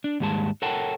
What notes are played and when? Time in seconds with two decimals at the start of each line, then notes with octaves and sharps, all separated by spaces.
0.04 D4
0.20 D#2 G#2 G3 G#3 A5
0.62 A4 A#4 C#5 F#5 G5 A5